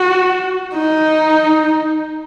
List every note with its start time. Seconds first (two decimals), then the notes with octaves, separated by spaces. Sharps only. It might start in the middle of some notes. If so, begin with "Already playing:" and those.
Already playing: F#4
0.74 D#4